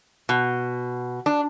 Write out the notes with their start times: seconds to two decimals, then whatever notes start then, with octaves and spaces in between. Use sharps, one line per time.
0.29 B2
1.26 D4